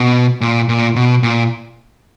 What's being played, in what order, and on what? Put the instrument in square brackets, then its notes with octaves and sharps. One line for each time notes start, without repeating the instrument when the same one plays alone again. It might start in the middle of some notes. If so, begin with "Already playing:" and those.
Already playing: [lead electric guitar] B2
A#2
A#2
B2
A#2